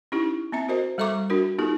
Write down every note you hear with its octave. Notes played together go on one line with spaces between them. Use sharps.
C#4 D#4 E4 G4
B3 C4 E5 A#5
F#4 A#4 C5 D#5
G3 A4 E5 A#5 C#6 D6
D4 F#4 A#4
B3 D#4 F4 G4 A4